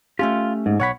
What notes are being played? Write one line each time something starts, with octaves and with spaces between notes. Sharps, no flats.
A3 C#4 F4 G4
G#2
B1 C#5 F#5 B5